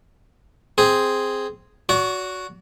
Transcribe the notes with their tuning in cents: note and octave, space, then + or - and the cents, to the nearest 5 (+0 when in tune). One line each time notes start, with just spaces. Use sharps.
C4 +0 G#4 +0
F#4 +0 D5 -45